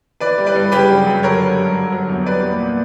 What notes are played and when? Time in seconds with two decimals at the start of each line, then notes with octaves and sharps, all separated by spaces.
0.20 E3 B4 D5
0.38 G3
0.46 B4 D5
0.55 G2
0.72 C#3 G4 B4
0.90 F#3
1.06 F#2
1.23 D3 A#4 C#5
1.40 G3
1.58 G2
1.75 D3
1.92 F#3
2.09 E2
2.26 G3 B4 D5
2.43 A#2
2.60 A#2